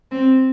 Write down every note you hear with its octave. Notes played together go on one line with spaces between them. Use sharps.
C4